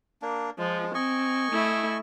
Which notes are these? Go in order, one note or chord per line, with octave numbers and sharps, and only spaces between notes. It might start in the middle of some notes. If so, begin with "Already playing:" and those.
A#3 D4
F3 G#3
C4 D#5 G#5 C#6
A3 E4